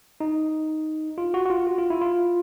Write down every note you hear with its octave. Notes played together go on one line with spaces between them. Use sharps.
D#4
F4
F#4
F#4
F4
F#4
F4
E4
F4